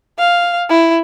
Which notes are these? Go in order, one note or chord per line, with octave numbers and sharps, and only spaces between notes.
F5
E4